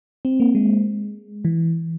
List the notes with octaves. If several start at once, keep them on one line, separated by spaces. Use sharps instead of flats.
C4
A#3
G#3
E3